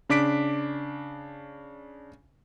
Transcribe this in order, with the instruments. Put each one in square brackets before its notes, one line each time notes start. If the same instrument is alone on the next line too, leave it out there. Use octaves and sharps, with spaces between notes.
[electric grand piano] C#3 D4 D6 B6 D7